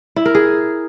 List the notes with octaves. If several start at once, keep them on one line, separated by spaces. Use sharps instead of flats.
E4
A#4
G#4